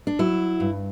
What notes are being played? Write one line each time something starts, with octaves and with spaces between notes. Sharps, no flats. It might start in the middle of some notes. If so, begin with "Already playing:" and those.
D4
F#3 E4
G2